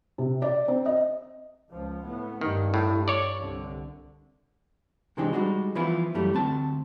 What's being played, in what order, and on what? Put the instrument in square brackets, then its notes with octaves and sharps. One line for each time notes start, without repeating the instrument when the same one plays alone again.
[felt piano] C3
D5
C4
D#5
[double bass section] C#2 F3
A2 B3
[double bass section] G2 [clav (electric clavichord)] D#3
[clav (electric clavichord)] A2
C#5 D5
[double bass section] C2 D3
[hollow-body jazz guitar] C3 E3 G#3 C4 D4 D#4
G3 G#3 D#4 F#4
E3 F3 B3 E4 F4
F#2 E3 G3 A3
D2 C4 A5